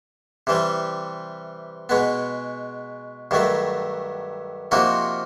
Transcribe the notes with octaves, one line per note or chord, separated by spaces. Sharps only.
C3 E3 G3
B2 G#3 B3
G2 D#3 F#3 A3
C3 F3 A#3 D#4 F#4